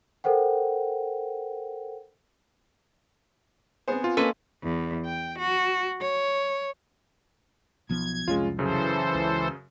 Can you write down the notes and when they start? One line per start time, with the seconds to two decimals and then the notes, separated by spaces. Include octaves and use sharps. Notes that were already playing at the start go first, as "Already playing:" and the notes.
0.24 A4 A#4 C5 F#5 G5
3.88 B3 C4 G#4 C5 G#5
4.04 F4
4.17 A#3 C#4 A4 B4 D#5 F5 C6
4.63 E2
5.06 G5
5.38 F#4
6.01 C#5
7.89 B1 F3 B3 G#6
8.28 C2 F2 G#3 C#4 F4
8.59 F#2 C#3 E3 A4 C5
9.15 C#2